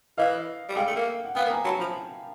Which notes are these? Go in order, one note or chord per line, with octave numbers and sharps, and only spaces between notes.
E3 D#5 F5
G3
G#3 F5 G5
A3
A#3
F#5
B3 F5 G5
A#3
G#5 A#5
F#3 A5 B5
F3